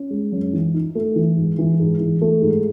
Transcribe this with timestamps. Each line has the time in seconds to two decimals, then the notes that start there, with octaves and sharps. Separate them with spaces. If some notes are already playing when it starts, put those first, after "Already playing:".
Already playing: C#4
0.11 G#3
0.32 F#2
0.53 E3
0.74 D#4
0.95 A3
1.16 E3
1.36 G#2
1.59 E3
1.80 G#2
2.00 E3
2.22 A3
2.42 G#2